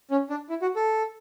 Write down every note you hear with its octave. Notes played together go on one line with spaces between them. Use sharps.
C#4
D4
E4
F#4
A4